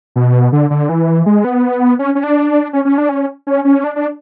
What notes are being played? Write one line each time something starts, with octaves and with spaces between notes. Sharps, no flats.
B2
D3
D3
E3
G#3
B3
C#4
C#4
D4
C#4
C#4
D4
C#4
C#4
C#4
D4
D4